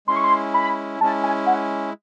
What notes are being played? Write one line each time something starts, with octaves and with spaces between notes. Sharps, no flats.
G#3 C#4 E4 C6
C#6
C6
B5
G#3 C#4 E4 A5
G#5
F#5